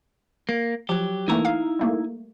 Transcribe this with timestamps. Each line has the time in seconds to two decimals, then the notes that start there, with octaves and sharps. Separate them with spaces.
0.49 A#3
0.89 F3 F#3 G4
1.28 E3 A3 A#3 D#4 E4 A#5
1.45 F5
1.79 G3 A3 A#3